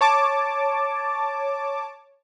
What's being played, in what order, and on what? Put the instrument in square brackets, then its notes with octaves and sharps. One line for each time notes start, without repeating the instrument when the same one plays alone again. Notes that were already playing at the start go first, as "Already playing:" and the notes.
[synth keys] C#5 A5 D6